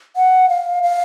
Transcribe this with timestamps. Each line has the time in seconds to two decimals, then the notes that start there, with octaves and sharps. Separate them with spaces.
0.16 F#5
0.49 F5
0.83 F5